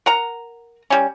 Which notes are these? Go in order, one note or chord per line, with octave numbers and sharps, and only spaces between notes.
A#4 F#5 A#5
G3 C#4